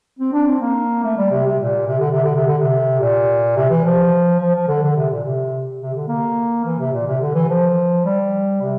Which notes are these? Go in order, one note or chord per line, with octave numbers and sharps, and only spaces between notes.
C4
D4
C4
A#3
A3
G3
C3
C3
A#2
C3
D3
C3
D3
C3
D3
C3
A#2
C3
E3
F3
F3
F3
D3
D3
C3
A#2
C3
C3
D3
A#3
E3
C3
A#2
C3
D3
E3
F3
G3
C3